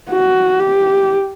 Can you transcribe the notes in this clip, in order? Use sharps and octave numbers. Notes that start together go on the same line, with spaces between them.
F#4
G4